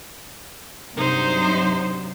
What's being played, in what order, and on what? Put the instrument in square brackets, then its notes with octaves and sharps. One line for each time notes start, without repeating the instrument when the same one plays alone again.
[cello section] G2 C3 F#3 [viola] D#4 C5